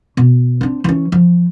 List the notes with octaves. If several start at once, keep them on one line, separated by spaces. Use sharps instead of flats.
B2
C4 D4
E3 C#4
F3